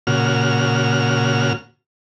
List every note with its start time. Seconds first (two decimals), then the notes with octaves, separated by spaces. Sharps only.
0.07 A#2 C#3 F#4 F6